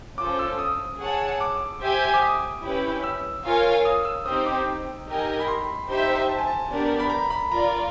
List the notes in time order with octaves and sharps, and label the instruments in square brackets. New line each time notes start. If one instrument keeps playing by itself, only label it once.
[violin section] C#4 F4 A4 C5 [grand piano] D6
[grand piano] E6
D#6
[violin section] G#4 C#5 F#5 A5
[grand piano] D6
[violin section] G4 C5 E5 G#5
[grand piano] D6
D#6
[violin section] C#4 E4 G4 B4
[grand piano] E6
[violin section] F4 A#4 C#5 F5 G#5
[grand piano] D#6
E6
[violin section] C4 D#4 G4 C5 [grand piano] D#6
[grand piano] D6
[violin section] D#4 G4 A#4 D#5 G#5
[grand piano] B5
C6
[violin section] D#4 G4 C5 E5
[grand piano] A5
G#5
A5
[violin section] B3 D4 G4 A#4 D5
[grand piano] B5
A#5
B5
[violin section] F4 A#4 D5 [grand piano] A#5